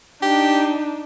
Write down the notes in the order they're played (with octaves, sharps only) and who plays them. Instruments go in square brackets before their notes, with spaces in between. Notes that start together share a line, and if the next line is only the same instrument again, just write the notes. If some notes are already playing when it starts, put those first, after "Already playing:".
[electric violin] D4 D#4 [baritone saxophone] G4